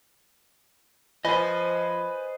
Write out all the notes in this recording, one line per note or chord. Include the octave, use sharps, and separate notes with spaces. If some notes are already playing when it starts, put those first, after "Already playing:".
F3 B4 C5 D#5 G#5